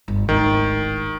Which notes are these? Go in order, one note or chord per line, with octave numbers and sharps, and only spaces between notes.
G1
D1 G#1 D#3